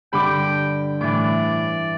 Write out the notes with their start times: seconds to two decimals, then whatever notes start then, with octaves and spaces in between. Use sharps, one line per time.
0.13 G2 D3 G5 B5 D6 G6
1.01 A2 E3 D5 D6